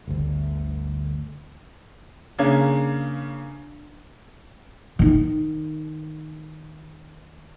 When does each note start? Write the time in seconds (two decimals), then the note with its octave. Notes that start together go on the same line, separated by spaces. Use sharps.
0.07 G1 D2
2.38 C#3 A#3 C#4 D4 G#6
4.99 D#3 D#4